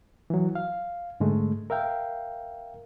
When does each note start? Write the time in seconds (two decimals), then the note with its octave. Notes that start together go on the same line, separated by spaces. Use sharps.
0.30 E3 F#3
0.55 F5
1.20 G#2 D3 G#3 A3
1.70 A#4 E5 F5 G5